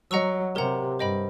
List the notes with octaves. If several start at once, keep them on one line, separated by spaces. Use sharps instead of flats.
F#3 D#5 F#5 A#5 C#6 E6
C3 G4 A#4 C#5 F#5 A#5
G2 C5 D#5 G5 B5